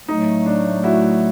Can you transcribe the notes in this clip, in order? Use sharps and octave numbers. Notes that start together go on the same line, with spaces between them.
A2 F#3 A3 D#4
D4
E4 F#4